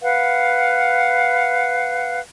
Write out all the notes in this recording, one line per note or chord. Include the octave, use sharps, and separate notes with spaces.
B4 F5 F#5